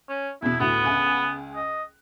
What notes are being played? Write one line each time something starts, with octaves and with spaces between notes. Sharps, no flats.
C#4
E2 B2 E4
D2 A2 B3 F#4
C#2 G#5 F#6
D#5